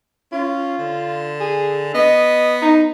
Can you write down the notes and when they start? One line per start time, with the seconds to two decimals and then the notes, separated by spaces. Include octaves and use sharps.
0.32 C#4 F4
0.78 D3
1.40 G#4
1.95 B3 D#5
2.62 D#4